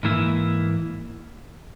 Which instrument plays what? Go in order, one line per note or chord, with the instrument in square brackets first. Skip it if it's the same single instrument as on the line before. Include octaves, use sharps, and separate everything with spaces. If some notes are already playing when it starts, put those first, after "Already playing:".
[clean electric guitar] G#2 E3 A#3 E4